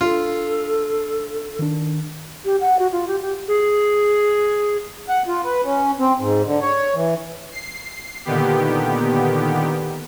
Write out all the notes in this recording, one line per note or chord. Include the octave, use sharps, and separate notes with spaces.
D4 F4 A4
D#3 D4
G4
F#5
F#4
F4
G4
G4
G#4
F#5
F4
B4
C#4
C4
G#2
D3
C#5
E3
C7
A#2 D3 D#3 B3 G4